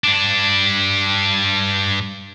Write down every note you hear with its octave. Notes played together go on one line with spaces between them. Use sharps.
G2 D4